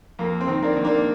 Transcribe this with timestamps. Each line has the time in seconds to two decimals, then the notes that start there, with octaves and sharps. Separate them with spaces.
0.19 F2 A#3
0.41 C4
0.48 D#3
0.63 A#3 D4
0.76 D#3
0.84 A#3 D4